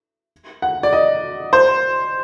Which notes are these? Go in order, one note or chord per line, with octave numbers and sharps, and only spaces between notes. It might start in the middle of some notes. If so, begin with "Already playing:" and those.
F#5
D5
D#5
C5